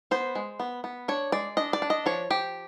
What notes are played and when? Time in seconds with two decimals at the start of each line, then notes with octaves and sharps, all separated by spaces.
0.11 B3 C5
0.35 G#3
0.60 B3
0.84 B3
1.08 D4 C#5
1.32 G#3 D5
1.57 D4 D#5
1.73 D5
1.82 D4
1.90 D#5
2.06 F3 C#5
2.30 F3 G4